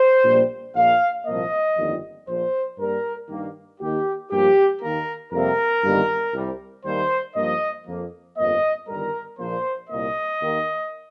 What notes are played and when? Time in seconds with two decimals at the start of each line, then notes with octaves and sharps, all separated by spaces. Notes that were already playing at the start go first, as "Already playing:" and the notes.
Already playing: C5
0.25 A#1 A#2 G3 A#3
0.75 A#1 A#2 A#3 F5
1.26 C2 A#2 F3 A#3 D#5
1.77 G1 F2 D#3 G3 A#3
2.28 A#1 A#2 F3 C5
2.78 G2 G3 A#3 A#4
3.29 G2 D#3 A#3
3.80 D#2 D#3 A#3 G4
4.31 G2 F3 A#3 G4
4.82 D#2 D#3 A#3 A#4
5.32 F2 C3 G3 A#3 A#4
5.83 G1 G2 D#3 G3 A#3
6.34 C2 C3 G3
6.85 D#2 D#3 G3 A#3 C5
7.36 G2 F3 A#3 D#5
7.86 F2 F3 A#3
8.37 G1 F2 F3 A#3 D#5
8.88 G1 G2 D#3 G3 A#4
9.39 A#1 A#2 F3 A#3 C5
9.90 C2 A#2 A#3 D#5
10.41 D#2 D#3 A#3